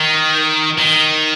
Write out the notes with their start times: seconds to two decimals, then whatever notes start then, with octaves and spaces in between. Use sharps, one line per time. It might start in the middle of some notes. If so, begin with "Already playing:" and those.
Already playing: D#3
0.78 D#3